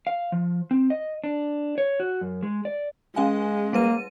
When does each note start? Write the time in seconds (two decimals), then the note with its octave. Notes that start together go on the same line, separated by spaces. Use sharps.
0.07 F5
0.32 F3
0.71 C4
0.90 D#5
1.24 D4
1.78 C#5
2.00 F#4
2.21 F#2
2.43 G#3
2.65 D5
3.16 G#3 C#4 F5 G#5
3.73 G3 A#3 B4 D#7